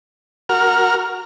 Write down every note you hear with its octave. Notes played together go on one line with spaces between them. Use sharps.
F#4 A#4 F6